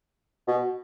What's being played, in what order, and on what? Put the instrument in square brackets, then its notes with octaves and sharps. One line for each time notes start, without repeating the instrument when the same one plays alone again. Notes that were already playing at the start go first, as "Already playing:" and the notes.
[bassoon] B2